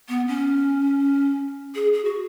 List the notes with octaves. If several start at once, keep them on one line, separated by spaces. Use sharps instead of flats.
B3
C#4
G#4
G#4
F#4